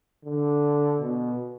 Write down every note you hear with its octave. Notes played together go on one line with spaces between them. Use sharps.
D3
B2